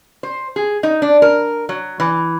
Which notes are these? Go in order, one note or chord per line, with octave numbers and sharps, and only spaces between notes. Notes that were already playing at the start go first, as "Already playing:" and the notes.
C5
G#4
D#4
D4
A#4
F#3
E3